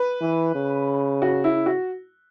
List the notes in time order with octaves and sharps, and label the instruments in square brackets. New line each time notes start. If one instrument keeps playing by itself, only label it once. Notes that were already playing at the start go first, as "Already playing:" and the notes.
Already playing: [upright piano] B4
[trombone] E3
C#3
[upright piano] F#4
E4
F#4